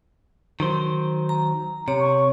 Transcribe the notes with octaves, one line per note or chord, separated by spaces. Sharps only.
D#3 F#3 C5
A#5
C3 C#5
C#6